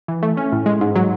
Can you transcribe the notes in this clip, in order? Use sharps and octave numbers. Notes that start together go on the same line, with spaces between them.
E3
A3
C#4
A2
G#3
G#2
F#3